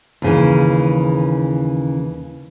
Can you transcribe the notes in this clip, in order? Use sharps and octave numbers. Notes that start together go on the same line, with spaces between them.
D#2 C#3 E3